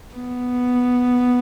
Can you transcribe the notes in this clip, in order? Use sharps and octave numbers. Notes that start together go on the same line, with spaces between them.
B3